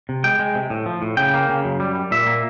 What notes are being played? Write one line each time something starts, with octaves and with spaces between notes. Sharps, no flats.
C3
G#3 G5
G#3
C3
A2
F3
A2
C#3 G5
A#3
C#3
F#2
G3
G3
A#2 E5
A#3